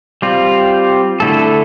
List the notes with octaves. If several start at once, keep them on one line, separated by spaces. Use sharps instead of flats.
G3 C4 F4
D3 A3 E4 A4